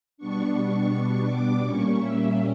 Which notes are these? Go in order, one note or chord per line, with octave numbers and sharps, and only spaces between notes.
B2 G3 B3 D4 C#6
C#6
D6
A#2 G3 A#3 C#4 C#6
E5